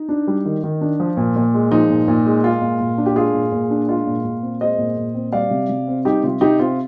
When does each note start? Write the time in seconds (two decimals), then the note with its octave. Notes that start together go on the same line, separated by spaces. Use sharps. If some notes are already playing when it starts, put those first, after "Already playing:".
Already playing: D#4
0.09 D4
0.27 G3
0.46 D#3
0.64 D#3
0.81 D4
1.00 F3
1.17 A#2
1.36 A#2
1.54 G#3
1.71 F3 D#4
1.90 A#2
2.08 A#2
2.26 G#3
2.44 G#3 F4
2.62 A#2
2.80 A#2
2.98 D4
3.06 G4
3.16 G#3 F4 G#4
3.34 A#2
3.52 A#2
3.71 D4
3.88 G#3 F4
4.07 A#2
4.25 A#2
4.42 C4
4.61 G#3 C5 D#5
4.78 A#2
4.97 A#2
5.15 C4
5.33 G3 D5 F5
5.51 C3
5.69 C3
5.88 C4
6.05 G3 D#4 G4
6.23 C3 F4
6.41 C3 D#4 G4
6.59 C4 F4